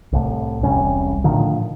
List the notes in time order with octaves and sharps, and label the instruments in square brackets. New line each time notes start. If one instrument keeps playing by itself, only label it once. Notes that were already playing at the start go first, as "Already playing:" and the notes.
[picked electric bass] C2 A2
E1 C2 G3 C#4
A2 D3 D#3 F3